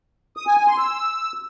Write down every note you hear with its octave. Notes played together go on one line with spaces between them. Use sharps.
D#6
G#5
G#5
C6
E6